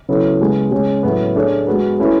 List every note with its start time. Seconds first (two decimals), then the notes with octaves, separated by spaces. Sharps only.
0.09 C#3 F#3 B3 E4 A4
0.40 C#3 G#3 B3
0.71 C#3 G#3 C#4
1.03 A2 F#3 B3
1.35 A3 D4 G#4 C#5
1.67 G#3 B3 F#4 B4
1.99 A3 C#4 E4 B4